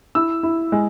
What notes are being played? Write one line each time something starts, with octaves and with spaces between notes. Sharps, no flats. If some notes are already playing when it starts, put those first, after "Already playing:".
E4 E6
E4
G#3